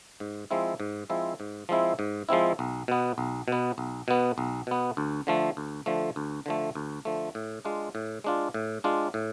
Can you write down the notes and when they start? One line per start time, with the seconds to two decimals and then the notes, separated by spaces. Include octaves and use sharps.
0.20 G#2
0.51 F3 G#3 C4 E4
0.80 G#2
1.10 F3 G#3 C4 E4
1.40 G#2
1.69 F3 G#3 C4 E4
1.99 G#2
2.29 F3 G#3 C4 E4
2.59 B1
2.88 B2 B3
3.18 B1
3.48 B2 B3
3.78 B1
4.08 B2 B3
4.38 B1
4.67 B2 B3
4.97 D2
5.27 D3 F3 A3
5.57 D2
5.86 D3 F3 A3
6.16 D2
6.46 D3 F3 A3
6.75 D2
7.05 D3 F3 A3
7.35 A2
7.65 G#3 D4 F4
7.95 A2
8.24 G#3 D4 F4
8.54 A2
8.84 G#3 D4 F4
9.14 A2